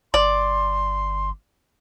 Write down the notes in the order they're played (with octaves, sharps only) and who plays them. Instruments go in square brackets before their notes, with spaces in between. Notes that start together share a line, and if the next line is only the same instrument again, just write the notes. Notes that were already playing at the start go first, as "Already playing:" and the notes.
[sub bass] G1 [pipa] D5 [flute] C6